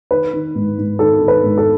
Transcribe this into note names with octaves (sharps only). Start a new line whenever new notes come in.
D#3 B4
D#3
G#2
G#2
D#3 A4
D#3
B4
G#2
A4